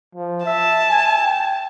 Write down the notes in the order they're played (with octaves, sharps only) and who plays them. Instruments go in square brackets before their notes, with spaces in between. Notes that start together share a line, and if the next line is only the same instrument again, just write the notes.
[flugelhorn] F3
[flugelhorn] E5 [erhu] A5
[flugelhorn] G#5
G5